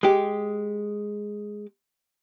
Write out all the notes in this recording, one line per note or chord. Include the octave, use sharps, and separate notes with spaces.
G#3 G4